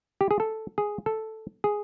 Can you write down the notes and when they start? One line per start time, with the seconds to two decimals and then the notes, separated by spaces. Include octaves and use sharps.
0.21 G4
0.31 G#4
0.40 A4
0.78 G#4
1.06 A4
1.64 G#4